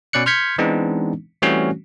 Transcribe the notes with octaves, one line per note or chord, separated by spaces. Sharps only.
B2 C#4 D5 F#6 C#7
C6 F6 G6 G#6 B6 C#7
E3 G#3 B3 C4 D4 D#4
E3 G3 A3 C4 C#4 F#4